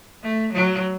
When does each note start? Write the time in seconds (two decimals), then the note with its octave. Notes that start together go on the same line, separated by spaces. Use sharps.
0.23 A3
0.53 F#3